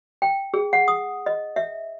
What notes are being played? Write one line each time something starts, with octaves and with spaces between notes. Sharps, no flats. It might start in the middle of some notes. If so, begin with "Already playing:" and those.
G5
G#4
F#5
D#6
D#5
E5